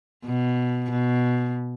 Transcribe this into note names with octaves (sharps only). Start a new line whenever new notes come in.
B2
B2